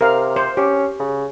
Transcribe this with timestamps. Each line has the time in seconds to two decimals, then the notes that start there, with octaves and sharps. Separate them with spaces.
0.01 C3 A#4 F5
0.36 C5
0.57 C#4 G4
1.00 C#3